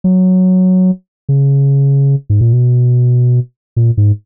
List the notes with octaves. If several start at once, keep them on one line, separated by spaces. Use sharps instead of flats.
F#3
C#3
G#2
A#2
B2
A#2
G#2